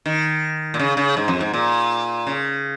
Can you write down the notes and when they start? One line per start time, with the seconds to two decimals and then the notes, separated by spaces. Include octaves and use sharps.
0.06 D#3
0.74 A#2
0.79 C#3
0.97 C#3
1.17 G#2
1.28 F2
1.41 G#2
1.54 A#2
2.27 C#3